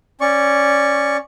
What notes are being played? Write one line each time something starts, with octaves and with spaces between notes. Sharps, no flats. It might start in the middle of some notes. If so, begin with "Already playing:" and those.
C#4 D5 C#6